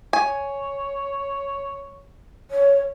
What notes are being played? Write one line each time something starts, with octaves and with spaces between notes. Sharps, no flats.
C#5 G#5
C#5